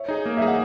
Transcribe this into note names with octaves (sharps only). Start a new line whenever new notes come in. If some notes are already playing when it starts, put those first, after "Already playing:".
Already playing: C#5 E5
D#4 G#4
A#3
D#4 G#4 E5
F#5